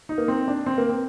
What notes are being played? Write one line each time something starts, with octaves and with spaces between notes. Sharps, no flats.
D#4
A#3
C4
D4
C4
A#3
C4